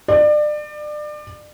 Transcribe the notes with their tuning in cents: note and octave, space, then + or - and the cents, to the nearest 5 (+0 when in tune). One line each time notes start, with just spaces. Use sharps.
D5 +30